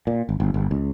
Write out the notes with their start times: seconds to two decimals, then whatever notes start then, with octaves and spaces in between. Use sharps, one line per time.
0.07 A#2
0.29 G#1
0.40 G1
0.54 G1
0.71 C#2